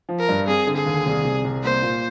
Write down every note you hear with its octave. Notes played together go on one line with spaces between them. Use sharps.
F3
A#4
G2
C4 G#4
D3
G#4
D#2
C2
C3
C2
A#3 C5
A#2